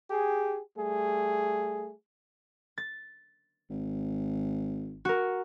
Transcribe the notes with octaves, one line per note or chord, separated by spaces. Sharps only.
G4 G#4
G3 A3 G#4
A6
G#1
F#4 A#4